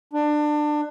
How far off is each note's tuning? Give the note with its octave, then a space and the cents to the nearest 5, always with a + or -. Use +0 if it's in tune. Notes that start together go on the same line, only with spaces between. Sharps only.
D4 +25